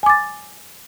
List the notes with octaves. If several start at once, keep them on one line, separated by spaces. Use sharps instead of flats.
G#5 D6 A6